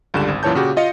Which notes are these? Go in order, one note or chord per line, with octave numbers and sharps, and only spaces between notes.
C#2 G2 D3 G3 E7
G#1
F#2 A#2 E3 C#5 A5 G6
A#2 C#3 F#4 G4
F4 D#5 F5 C#7